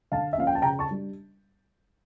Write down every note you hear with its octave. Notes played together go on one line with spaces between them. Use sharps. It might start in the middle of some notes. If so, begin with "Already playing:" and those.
D3 F5 A5
E5
F3 A#3 C#4 F5
G5
A5
C#3 G5 A#5
A5 C#6
G3 D4